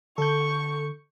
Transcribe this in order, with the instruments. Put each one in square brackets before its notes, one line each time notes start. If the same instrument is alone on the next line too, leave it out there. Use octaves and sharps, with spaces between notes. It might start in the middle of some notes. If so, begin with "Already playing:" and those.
[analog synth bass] D3 [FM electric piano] A4 G6 [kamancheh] C#6